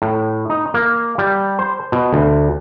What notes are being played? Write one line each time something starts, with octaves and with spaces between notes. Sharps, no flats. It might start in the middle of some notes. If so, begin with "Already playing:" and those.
A2
D#4
A#3
G3
C5
B2
D2